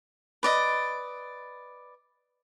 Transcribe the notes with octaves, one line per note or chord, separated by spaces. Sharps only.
B4 D5 D#5